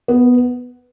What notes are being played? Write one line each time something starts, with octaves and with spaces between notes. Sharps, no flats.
B3